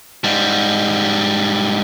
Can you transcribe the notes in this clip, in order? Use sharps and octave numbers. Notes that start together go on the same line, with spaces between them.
G#2 G3